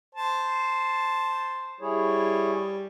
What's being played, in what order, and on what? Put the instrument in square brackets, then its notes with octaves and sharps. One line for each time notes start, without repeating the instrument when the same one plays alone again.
[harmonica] C5 A5
[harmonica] G3 [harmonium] E4 G#4 C#5